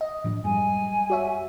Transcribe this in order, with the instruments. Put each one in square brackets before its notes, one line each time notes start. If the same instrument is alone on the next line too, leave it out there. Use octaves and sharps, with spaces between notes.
[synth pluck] D#5
[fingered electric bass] A2 F3 D4
[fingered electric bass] F#2 G3 G#3 [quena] G#5
[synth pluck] F#4 C#5 E5